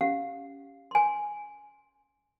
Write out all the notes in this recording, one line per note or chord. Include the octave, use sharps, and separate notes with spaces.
C#4 G4 F5 F#5
G#5 C6